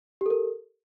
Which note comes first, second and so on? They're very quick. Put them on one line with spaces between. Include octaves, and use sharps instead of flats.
G4 A4 A#4